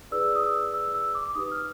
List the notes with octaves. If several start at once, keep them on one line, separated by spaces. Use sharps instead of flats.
E4 G#4 B4 D5 E6
D#6
E6
E6
E6
D6
D#4 G4 B4 D#6
F6